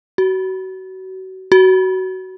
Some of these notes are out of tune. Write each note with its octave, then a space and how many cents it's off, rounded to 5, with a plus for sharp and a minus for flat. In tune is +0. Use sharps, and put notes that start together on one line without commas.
F#4 +30
F#4 +20